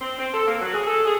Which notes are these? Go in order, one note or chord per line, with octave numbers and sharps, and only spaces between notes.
C4
C4
A4
A#3
F#3
G#4
A4
G#4